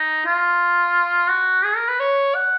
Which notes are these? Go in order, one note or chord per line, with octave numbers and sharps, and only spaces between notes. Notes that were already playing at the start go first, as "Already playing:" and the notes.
Already playing: D#4
F4
F#4
G#4
A#4
B4
C#5
F#5